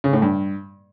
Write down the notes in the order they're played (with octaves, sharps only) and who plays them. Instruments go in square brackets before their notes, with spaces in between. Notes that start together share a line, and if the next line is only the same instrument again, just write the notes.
[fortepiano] C#3
A2
G2